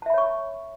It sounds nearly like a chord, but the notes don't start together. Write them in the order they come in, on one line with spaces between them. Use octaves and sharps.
A5 E5 B5 C#5 C#6